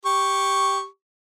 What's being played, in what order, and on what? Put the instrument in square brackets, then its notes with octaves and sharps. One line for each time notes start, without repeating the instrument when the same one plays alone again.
[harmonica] G4 C#6